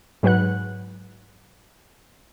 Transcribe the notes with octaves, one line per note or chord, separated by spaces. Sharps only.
G#2 F#3 B4 F#5 F#6